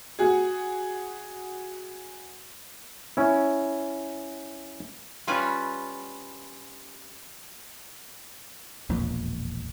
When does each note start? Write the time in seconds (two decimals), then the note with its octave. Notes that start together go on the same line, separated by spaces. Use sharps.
0.19 F#4 G#4
3.17 C#4 E4
5.27 G3 C#4 F4 B4
8.89 E1 A#1 F2 A#3